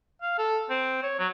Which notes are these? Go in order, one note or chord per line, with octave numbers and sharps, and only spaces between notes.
F5
A4
C4
C#5
F#3